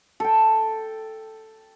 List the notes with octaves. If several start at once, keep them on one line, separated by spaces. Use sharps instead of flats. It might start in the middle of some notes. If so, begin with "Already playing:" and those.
A4 G5